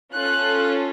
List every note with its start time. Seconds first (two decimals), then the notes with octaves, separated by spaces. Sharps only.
0.14 C#4 F4 A4 F#6